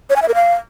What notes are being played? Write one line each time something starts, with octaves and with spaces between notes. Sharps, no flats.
C#5
G#5
E5
A#4
F5